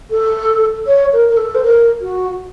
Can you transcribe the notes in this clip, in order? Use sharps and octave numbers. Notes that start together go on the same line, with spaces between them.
A4
C#5
A#4
A#4
A4
C5
A#4
F#4